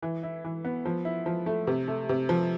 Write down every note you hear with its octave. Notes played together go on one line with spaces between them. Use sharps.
E3
E4
E3
B3
F3
E4
F3
A3
C3
A3
C3
F3